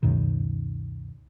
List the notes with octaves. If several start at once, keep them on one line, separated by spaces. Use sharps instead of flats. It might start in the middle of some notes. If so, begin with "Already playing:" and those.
C#2 F#2 B2 D#3